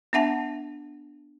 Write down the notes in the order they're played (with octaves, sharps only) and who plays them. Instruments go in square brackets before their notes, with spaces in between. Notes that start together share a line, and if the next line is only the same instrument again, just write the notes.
[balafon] B3 D4 E5 F#5 A5